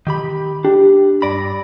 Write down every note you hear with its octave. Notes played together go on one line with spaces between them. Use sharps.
D#3 G4 B5
D4 G4
G2 D5 B5 A#6